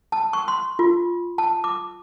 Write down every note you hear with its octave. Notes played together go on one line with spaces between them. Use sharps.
A5
C#6
C6
F4
A5
D6